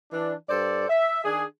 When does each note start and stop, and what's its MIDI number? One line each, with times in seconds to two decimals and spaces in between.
0.12 0.34 52
0.12 0.34 62
0.49 0.86 43
0.49 0.86 69
0.49 0.86 72
0.49 0.86 74
0.89 1.24 76
1.25 1.44 51
1.25 1.44 62
1.25 1.44 68